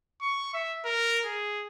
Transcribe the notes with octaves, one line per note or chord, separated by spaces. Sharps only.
C#6
E5
A#4
G#4